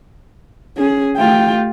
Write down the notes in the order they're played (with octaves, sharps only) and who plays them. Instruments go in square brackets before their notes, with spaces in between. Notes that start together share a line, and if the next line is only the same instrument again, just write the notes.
[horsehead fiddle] C#4 [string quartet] G#4
[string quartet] A3 F4 G4 [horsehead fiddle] G5